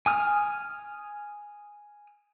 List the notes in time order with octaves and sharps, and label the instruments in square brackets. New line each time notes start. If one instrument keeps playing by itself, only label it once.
[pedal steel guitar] G#5 D#6 F6